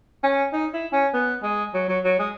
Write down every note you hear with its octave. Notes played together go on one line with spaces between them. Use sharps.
C#4
D#4
E4
C#4
B3
G#3
F#3
F#3
F#3
G#3